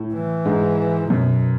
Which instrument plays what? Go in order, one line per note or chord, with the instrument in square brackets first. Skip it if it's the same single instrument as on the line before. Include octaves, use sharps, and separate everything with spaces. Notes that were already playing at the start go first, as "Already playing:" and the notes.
Already playing: [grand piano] A2
[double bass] E3
[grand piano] G#2
[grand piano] F#2 [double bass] B2